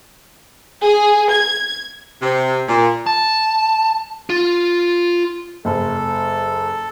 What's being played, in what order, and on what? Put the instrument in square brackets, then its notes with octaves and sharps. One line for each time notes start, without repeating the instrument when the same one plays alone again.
[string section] G#4
G#6
[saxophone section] C3
A#2
[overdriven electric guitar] A5
F4
[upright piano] F#1 [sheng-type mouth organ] A4